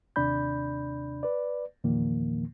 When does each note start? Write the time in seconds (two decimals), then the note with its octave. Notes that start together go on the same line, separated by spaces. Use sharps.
0.16 D#2 C3 D4 D5 B5 G6
1.23 B4 D5
1.84 E2 A#2 D#3 F3 A#3